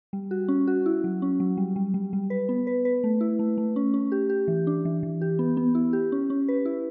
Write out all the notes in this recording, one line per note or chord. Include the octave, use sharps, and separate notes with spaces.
G3
F#4
C#4
F#4
E4
F#3
C#4
F#3
G3
G3
G3
G3
B4
B3
B4
B4
A3
E4
A3
A3
C#4
C#4
G4
G4
E3
D4
E3
E3
G4
B3
B3
E4
G4
C#4
C#4
B4
E4